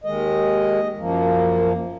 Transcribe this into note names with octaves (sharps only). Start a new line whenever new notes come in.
D#2 D#3 G#3 D#5
F#2 F3 A#3